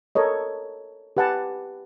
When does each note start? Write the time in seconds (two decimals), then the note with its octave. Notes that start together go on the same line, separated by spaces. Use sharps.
0.15 A4 A#4 C#5 D#5
1.17 G4 B4 F#5 G#5 A5